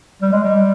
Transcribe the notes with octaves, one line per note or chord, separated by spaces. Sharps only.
G3
G#3
G3